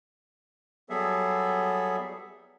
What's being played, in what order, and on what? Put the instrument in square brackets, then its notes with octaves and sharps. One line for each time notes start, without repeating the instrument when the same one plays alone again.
[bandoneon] F#3 G3 B3 G#4 A4 E5